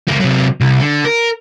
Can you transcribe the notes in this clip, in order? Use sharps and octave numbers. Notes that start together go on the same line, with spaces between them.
C#2 A#3
C3 F#3
C2
D3
A#4